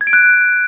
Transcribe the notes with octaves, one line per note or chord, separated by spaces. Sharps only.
G#6
D7
F#6